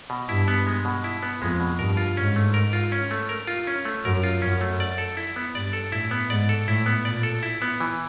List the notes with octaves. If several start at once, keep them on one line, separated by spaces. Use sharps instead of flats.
B2
G2 E4
B3
G#3
B2
E4
B3
F2 G#3
B2
G2 A#4
F4
G#2 C#4
A3
A#4
F4
C#4
A3
A#4
F4
C#4
A3
F#2 A#4
F4
F#2 C#4
A3
D5
A4
E4
B3
G2 D5
A4
A2 E4
B3
G#2 D5
A4
A2 E4
B3
A#2 D5
A4
E4
B3
E3